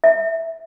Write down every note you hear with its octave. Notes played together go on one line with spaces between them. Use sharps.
E5